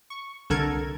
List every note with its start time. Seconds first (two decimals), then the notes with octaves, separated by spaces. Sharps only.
0.10 C#6
0.50 C2 D3 A4 A#4 G#6